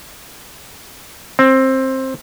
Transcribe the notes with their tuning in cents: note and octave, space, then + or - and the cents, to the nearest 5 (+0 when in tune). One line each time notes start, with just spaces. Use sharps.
C4 +15